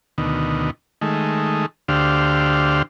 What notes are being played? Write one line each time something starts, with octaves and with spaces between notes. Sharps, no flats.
D2 B2 D#3
D#3 G#3 A3
D2 D3 G4 C5 F5